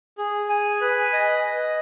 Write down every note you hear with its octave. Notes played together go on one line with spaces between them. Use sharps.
G#4
G#5
B4
D#5
D#5